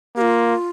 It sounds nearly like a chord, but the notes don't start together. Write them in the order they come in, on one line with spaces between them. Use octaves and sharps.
A#3 G4 F4